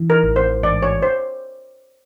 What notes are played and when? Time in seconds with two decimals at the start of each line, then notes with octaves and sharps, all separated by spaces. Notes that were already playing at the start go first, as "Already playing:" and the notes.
Already playing: E3
0.10 A#4
0.24 A1
0.36 C5
0.63 G#2 D5
0.83 C#5
1.02 C5